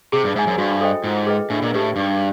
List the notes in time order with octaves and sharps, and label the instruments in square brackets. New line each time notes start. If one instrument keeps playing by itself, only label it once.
[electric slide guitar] C3 [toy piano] G#4
[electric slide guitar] G2
[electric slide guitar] G#2 [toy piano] C5 E5 G#5
[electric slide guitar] F#2
[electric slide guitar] G2 [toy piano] F#4
[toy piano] A4 C5 D#5 G5
[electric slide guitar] G#2 [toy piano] F4
[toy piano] G#4 B4 D#5 G5
[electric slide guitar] A2 [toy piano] D4
[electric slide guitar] A#2
[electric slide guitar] A2 [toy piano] G4 B4
[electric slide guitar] G2 [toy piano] D#4